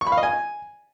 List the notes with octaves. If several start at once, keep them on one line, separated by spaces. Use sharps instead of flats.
C#6
B5
F5
D#5
G#5